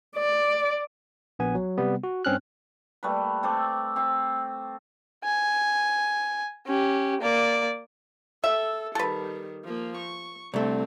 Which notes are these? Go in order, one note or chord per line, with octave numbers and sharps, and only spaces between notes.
D5
A#1 B3 G#5
F#3
C3 G3 B3
F#4
G2 C4 C#4 F6 F#6
G3 A3 A#3 B4
A3 C4 A4 D6
C4 E5
G#5
C#4 G4
A#3 D5
A4 E5
D#3 G3 A4 B4
F3 A#3
C#6
C2 D3 A3 C4